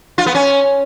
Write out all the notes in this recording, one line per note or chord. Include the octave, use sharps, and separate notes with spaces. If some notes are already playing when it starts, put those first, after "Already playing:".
F4
B3
C#4